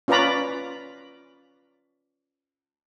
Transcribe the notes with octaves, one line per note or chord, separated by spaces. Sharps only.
C#4 F4 B4 D5 A#5 B5